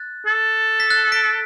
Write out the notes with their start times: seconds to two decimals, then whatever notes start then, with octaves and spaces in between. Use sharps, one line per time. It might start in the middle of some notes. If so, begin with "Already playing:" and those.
Already playing: F#6 A6
0.26 A4
0.80 B6
0.90 F#6 A6
1.12 B6 D7